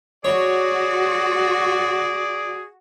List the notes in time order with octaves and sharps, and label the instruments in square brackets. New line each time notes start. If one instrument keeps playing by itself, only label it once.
[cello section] F#4 [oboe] G#4 [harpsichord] C#5 [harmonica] D5